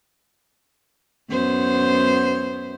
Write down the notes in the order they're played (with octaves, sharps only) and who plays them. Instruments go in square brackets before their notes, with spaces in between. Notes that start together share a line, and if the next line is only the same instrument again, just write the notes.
[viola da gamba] F#2 B3 C5